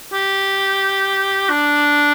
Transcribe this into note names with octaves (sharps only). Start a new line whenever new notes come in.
G4
D4